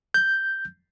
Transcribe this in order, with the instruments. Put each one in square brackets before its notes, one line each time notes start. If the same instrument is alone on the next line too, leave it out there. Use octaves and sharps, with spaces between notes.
[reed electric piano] G6